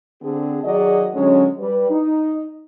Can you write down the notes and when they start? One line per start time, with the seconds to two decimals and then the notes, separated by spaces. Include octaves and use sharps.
0.22 D3 C4 G#4
0.64 D#3 F#3 F#4 G#4 D5 D#5
1.14 D3 F#3 G#3 C#4
1.59 G3 B4
1.91 D#4